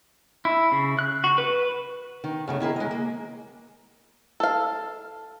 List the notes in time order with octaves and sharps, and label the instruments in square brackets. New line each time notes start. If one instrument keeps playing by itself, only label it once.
[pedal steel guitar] E4
C#3
F#6
F#4
B4
[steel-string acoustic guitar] D#3
F#2 C#3 A3
D#3 E4 G#4 A#4
G#3 D#5
A#3
[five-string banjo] A4 F5